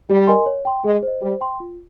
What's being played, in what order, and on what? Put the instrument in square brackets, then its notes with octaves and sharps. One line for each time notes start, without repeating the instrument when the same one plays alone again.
[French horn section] G3 [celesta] G4
[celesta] A#4 D#5 G#5 C6
C#5
G5 C6
[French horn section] G#3 [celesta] G#4
[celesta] C5 D#5
[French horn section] G3 [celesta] C5
[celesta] G5 C6
F4